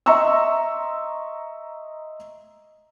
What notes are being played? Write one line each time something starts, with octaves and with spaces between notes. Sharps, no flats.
D#5 E5 A#5 C6 C#6 E6